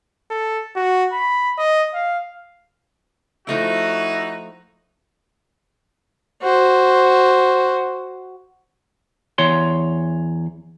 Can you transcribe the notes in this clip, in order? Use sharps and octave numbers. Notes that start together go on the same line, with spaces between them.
A4
F#4
B5
D#5
F5
F3 A3 D#4 E4 F#4 G5
F#4 C5
E2 C#5 C6